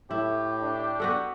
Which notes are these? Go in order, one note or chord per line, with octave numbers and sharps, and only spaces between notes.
A2 E4 G4
D4
B3 F#4 A4